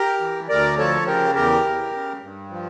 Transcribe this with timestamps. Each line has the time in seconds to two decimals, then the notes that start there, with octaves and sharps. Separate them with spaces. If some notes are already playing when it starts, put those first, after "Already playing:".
Already playing: G4 A#4
0.20 E3
0.49 D2 A#4 D5
0.78 F3 A4 C#5
1.06 C#3 G4 A#4
1.35 E2 G4 A#4
1.65 E3
1.92 C#3
2.22 G2
2.50 F3